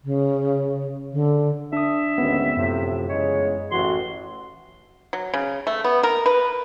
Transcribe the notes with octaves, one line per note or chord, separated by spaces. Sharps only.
C#3
D3
D4 E5 D#6
G#1 D2 B3 C#4
F#2 A2 C3 F3
E2 C#3 G#3 C#5
A1 E3 F#4 C6
F#3
C#3
A3
B3
A#4
B4